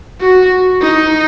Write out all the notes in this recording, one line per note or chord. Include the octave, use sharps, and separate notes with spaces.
F#4
D#4